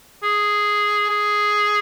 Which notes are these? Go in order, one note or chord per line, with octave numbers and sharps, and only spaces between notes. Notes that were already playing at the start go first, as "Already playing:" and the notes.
G#4
G#4